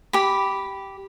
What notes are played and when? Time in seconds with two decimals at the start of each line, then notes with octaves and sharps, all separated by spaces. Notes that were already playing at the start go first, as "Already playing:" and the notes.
0.13 G4 B5